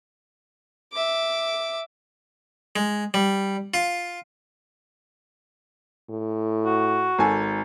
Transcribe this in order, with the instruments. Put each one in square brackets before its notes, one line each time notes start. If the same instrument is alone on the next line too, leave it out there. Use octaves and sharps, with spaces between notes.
[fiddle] E5 D6
[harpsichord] G#3
G3
F4
[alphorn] A2
[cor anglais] F#4
[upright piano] G#1 A4 G#5